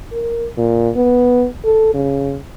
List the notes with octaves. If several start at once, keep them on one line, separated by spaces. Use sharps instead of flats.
A#4
A#2
B3
A4
C#3